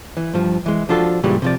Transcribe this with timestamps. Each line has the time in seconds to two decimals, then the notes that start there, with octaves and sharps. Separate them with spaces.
0.17 E3
0.34 G2 F3
0.66 E3 G#3
0.89 F3 D4 F4 F#4 A4
1.23 F#2 A#2 C#3 E3 F#3 G3
1.42 C3 F3 D5